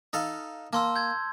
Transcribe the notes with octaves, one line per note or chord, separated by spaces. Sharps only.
D#4 A4 F5
A#3 A5 C6 E6
G6 G#6